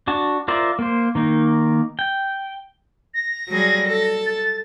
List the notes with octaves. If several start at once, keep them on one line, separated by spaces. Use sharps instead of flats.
D4 F#4 A5
F4 A#4 C5 D5 E5
A#3 C5
D#3 A#3 D#4
G5
A#6
F#3 G3 G#4
A4
A6